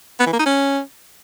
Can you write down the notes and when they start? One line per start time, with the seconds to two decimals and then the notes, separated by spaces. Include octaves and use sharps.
0.20 B3
0.26 E3
0.33 A#3
0.39 D#4
0.46 C#4